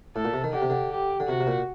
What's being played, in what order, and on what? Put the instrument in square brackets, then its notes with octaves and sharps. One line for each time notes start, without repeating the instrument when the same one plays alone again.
[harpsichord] A2 [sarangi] A4
[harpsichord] A#2
C3
D#3
[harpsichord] D3 [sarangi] G4
[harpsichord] C3
D3
[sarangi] G4
[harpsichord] D3
[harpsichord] C3 [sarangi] F#4
[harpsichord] C3
A#2